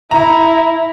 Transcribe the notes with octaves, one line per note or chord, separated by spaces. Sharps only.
E4 A#5